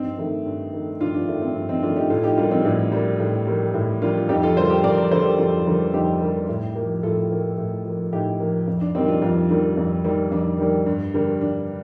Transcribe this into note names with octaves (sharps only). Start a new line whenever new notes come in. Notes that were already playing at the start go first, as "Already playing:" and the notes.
Already playing: G2 C4 D#4
D#3 A3
G2
D#3 A3
G2 D4 F4
D4
D#3 A3 D4
C4
G2
C4 D#4
D#3 A3 D4 F4
D#4 G4
A2 F4 A4
D#4 G4
G3 A#3 D4 F4
C4 D#4
A2 D4
G3 A#3
A2
G3 A#3
A2
G3 A#3 D4 F4
F2 D#4 G4
F4 A4
D3 G3 A#3 A4 C5
G4 A#4
F2 A#4 D5
A#4 D5
D3 G3 A#3 A4 C5
G4 A#4
F2 F4 A4
D3 G3 A#3
F2 D#4 G4
D3 G3 A#3
A2
F3 A#3
A2 F4 A4
F3 A#3
A2
F3 A#3
A2 D#4 G4
F3 A#3
F2
D4
D#3 G3 A#3 C4 D#4
D4 F4
F2 D4 F4
D#3 G3 A#3 D4
F2
D#3 G3 A#3
F2 D4
D#3 G3 A#3
G2
D3 G3 A#3
G2 D4